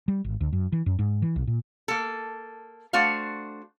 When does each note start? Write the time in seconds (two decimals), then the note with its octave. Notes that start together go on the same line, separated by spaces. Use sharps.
0.08 G3
0.24 G#1
0.41 D2
0.53 F#2
0.72 E3
0.86 F#2
0.99 G#2
1.22 E3
1.36 B1
1.47 A#2
1.88 A#3 A4
2.93 A3 D4 F#4 C5 F5